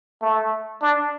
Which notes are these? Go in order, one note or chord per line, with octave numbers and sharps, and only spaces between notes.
A3
D4